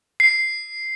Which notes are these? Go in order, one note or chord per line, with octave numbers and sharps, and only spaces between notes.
C7